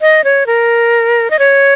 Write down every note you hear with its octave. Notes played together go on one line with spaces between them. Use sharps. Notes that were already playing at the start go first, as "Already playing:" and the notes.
D#5
C#5
A#4
D#5
C#5